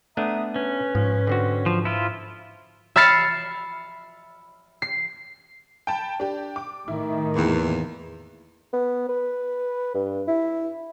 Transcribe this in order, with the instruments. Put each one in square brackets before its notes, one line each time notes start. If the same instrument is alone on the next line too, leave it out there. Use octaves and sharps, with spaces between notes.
[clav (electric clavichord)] A3 B3 D4 [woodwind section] E5 A#5 D#6
[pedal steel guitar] C#4 [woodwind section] B4
[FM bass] G#2 [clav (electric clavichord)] F3
[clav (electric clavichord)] D3 C4 F#4
[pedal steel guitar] F3
[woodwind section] F3 [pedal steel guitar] E4 F4
[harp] E5 B5 F6 A6 C7 C#7
C7
[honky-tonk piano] G5 A5 B5
D4 G4
D6
[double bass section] A2 D#3 [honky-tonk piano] E4
[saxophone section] E2 [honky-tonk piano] A#2
[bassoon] B3
B4
G2
E4